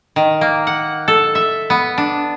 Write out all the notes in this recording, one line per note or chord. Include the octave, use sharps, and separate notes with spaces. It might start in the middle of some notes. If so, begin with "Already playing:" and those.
D#3
A#3
F#5
A4
E5
B3
D4